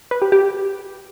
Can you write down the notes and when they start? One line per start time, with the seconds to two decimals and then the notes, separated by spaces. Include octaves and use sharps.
0.11 B4
0.22 G4
0.32 G4